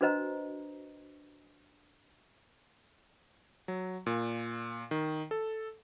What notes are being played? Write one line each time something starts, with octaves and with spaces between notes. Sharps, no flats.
D4 F#4 B4 C5 D#5 A#5
F#3
A#2
D#3
A4